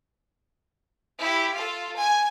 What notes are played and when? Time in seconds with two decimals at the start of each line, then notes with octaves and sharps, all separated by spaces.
1.19 E4 G4
1.53 F4 A4
1.96 G#5